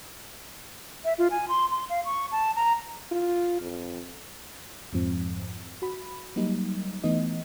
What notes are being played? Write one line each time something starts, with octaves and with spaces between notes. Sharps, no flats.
E5
F4
G#5
C6
C6
F5
C#6
A5
A#5
F4
F2
F2 G#2 F3 C4
F#4 B5
F#3 G3 A#3 D#4
E3 A3 B3 D#4 D#5